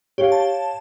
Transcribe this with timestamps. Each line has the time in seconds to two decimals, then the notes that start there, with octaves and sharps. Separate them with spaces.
0.18 G4 C#5 F5
0.32 A5